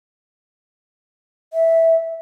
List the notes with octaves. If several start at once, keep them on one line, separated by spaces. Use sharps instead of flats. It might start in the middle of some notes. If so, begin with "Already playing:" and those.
E5